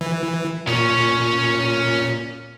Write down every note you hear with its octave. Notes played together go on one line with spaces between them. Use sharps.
E3
A#2 C#4 C#5